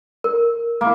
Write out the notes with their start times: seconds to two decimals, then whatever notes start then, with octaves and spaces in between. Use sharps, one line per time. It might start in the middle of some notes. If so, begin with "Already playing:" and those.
0.24 A#4
0.81 A#3 E4